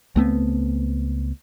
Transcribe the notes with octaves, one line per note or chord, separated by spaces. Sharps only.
C#2 A3 B3 C4